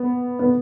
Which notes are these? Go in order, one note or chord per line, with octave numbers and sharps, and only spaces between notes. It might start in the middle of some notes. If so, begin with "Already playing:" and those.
Already playing: B3
B3